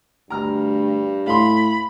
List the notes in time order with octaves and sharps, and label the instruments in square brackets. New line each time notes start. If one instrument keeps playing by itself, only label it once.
[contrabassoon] D2 [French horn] G2 [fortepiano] A#5 F6
[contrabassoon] A2 [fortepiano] F5 C6 [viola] B5